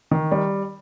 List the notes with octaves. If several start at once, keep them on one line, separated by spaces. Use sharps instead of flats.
D#3
G3